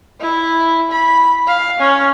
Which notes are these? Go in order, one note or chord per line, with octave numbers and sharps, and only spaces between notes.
E4
B5
F5
C#4